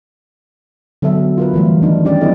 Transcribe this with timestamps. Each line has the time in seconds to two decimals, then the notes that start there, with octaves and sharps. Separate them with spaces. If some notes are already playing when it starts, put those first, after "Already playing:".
1.02 D3 F#3 B3 A4 E5
1.38 F4 A#4 B4
1.54 E3 G3 A3
1.82 D#3 D4 D#4
2.05 C#4 D4 G4 D5
2.21 F#3 B3 E4 A4 D#5